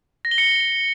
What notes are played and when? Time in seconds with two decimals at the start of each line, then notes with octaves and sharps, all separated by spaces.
0.25 A#6
0.31 G7
0.38 C#7